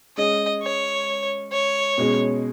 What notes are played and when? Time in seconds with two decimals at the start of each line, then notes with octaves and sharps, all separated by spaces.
0.17 G#3 C#4 G#4 D#5
0.63 C#5
1.52 C#5
1.98 B2 G#3 C#4 G#4